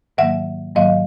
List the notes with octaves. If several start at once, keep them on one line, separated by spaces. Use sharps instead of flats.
G#2 D#3 F#3 A#3 E5 F#5
G#2 D#3 F#3 A#3 D#5 F5